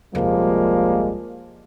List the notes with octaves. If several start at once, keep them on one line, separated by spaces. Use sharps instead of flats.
D#1 C2 F3 G3 G#3 A#3